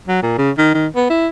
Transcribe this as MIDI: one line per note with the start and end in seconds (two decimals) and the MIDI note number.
0.08 0.22 54
0.23 0.36 46
0.38 0.51 49
0.58 0.74 51
0.74 0.87 51
0.96 1.09 59
1.10 1.28 64